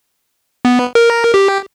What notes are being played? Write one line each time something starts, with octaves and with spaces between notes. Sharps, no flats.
B3
A#4
G4